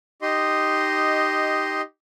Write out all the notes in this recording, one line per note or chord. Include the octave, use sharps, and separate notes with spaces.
D#4 G4 D#5 C6